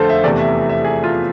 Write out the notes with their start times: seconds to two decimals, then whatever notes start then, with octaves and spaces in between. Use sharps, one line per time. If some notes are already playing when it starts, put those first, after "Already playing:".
Already playing: F2 D3 A3 A4 C5 F5
0.09 E5
0.24 E2 C3 E3 A3 D5
0.39 E5
0.69 E5
0.84 G#4
1.04 F4